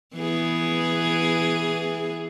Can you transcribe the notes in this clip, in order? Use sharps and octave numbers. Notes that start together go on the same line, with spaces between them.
E3 B3 G#4